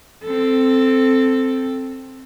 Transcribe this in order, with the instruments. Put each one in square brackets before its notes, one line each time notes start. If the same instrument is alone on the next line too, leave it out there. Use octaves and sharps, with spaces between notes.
[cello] C4 A4